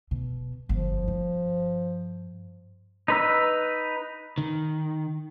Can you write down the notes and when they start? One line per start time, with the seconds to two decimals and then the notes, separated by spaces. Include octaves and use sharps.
0.11 B2
0.69 G1 F3
1.08 G2
3.08 D#4 B4 E6
4.38 D#3